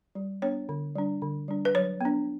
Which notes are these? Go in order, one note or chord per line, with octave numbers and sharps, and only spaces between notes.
G3
B3 D4 C#5
D3
G3 D4
D3
G3 D4
B4
F#3 C#5
B3 D4